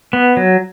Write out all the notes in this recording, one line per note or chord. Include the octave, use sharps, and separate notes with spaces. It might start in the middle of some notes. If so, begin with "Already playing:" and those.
B3
F#3